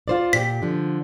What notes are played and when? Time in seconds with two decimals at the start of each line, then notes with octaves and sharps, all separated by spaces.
0.08 F4 C5 D5
0.33 A#2 G4 B6
0.62 D3 F3